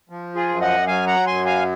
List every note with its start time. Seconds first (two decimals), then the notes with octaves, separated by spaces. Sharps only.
0.09 F3
0.35 F4 G#4
0.49 F#2
0.61 D#5 F#5
0.87 F#3 F5 G#5
1.07 F#5 A#5
1.26 F#2 G#5 C6
1.46 F5 G#5